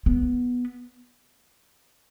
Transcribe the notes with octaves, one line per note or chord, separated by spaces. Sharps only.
B3